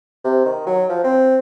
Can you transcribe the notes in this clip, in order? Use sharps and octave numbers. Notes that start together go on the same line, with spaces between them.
C3
D#3
F#3
F3
C4